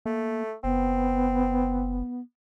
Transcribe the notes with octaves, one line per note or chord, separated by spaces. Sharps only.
A3 A#3
F#1 B3 C4